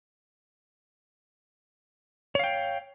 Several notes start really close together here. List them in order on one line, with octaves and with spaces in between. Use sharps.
C#5 F5 G5